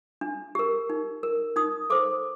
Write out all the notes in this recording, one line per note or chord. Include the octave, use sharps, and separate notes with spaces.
D4
G4 A#4
D#4
A#4
D#4 D#6
A4 C5 D6